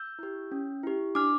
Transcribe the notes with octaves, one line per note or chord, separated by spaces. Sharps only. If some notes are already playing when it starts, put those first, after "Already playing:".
Already playing: E6 G6
E4 G4
C#4
E4 G4
D4 D6 F6